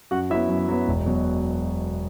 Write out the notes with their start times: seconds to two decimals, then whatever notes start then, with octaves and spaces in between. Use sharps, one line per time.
0.11 F#2 F#4 F#5
0.30 F#3 B3 E4 E5
0.49 F#2
0.68 F#3 B3
0.88 E1
1.06 B2 F#3